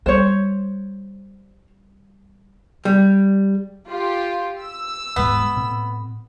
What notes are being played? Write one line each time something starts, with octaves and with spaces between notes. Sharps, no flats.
G3 C5 C#5
G3
F4 G4
E6
D#1 G#2 G#3 B3
A2 C4